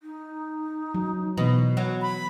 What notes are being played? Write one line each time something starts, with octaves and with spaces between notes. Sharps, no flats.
D#4
F#3
B2 E3 B3
F#3
B5